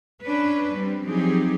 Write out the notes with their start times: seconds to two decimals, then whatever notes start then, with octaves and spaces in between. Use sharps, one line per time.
0.22 C#4 D4 B4
0.74 G3 C4
1.05 F3 F#3 C4 D#4 G4 G#4